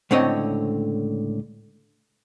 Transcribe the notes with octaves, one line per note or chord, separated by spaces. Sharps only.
C#2 A2 D3 C4 C#5 D#5